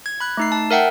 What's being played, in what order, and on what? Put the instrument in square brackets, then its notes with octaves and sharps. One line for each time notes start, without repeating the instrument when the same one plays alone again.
[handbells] G#6
B5 F#6
A3 D#4 C7
A5
A#4 E5 F#5 G5